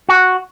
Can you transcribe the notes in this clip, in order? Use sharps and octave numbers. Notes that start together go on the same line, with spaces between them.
F#4